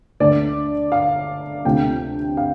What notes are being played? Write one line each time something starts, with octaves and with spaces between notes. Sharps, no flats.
D2 D3 A3 D5
F5
D2 C3 F3 A3 G5
F5